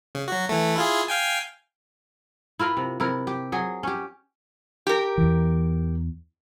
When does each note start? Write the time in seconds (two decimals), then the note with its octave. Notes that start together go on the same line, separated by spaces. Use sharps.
0.15 C#3
0.28 F#3 F#4
0.49 E3 A3
0.76 E4 F4 G#4
1.08 F5 G5 G#5
2.59 E4 F4 A#4 B4
2.77 C3
3.00 C3 E4 A#4
3.27 G4
3.52 F#3 G#4
3.83 C#4 G4
4.87 G4 A#4
5.18 E2 E3